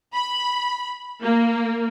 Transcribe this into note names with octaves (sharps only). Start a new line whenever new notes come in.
B5
A#3